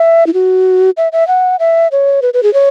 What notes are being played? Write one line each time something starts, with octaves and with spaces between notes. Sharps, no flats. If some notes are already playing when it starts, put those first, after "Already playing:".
Already playing: E5
E4
F#4
E5
E5
F#5
E5
C#5
B4
B4
G#4
C#5